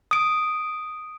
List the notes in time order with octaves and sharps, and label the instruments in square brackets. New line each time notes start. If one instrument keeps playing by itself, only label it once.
[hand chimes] D#6 D7